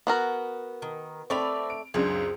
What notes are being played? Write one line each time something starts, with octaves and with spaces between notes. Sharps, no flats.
B3 F#4 A#4
D#3
A3 C4 D5 E5 B5 F7
D7
C#2 F#2 C4 D4 G#4